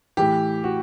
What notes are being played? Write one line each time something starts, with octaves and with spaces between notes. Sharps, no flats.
A2 E3 G4
F#4